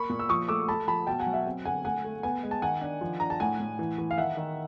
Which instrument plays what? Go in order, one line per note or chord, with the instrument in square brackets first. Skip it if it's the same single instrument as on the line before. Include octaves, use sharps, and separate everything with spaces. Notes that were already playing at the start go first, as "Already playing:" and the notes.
Already playing: [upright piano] A#3 B5 C#6
A#2
E6
F3 C#6 D#6
A3 D6 E6
A3 A5 B5
F3 A5 B5
B2 G5 A5
F#5 G#5
F#3
E5 F#5
C4
D3 F#5 G#5
A3 F#5 G#5
A3
B3 F#5 G#5
G#3
A5
D#3 F#5 G#5
D4
F3
D4 A#5
A5
A2 F#5 G#5
A2
E3
E3
F5
D#3 E5 F#5
D#3